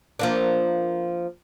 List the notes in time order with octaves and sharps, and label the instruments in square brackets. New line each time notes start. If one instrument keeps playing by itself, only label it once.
[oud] F3 A#3 D4